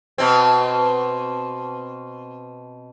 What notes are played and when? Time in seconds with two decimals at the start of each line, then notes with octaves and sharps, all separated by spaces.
0.18 B2 C4